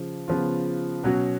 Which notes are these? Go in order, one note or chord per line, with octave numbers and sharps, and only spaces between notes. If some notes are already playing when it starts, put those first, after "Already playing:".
Already playing: C#3 F3
C#3 F3 B3 F4
B2 F#3 C#4 F#4